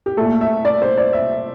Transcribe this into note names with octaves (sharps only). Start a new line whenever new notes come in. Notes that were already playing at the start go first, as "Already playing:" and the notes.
G4
A#2 A3 A4
E5
D5
C5
D5
E5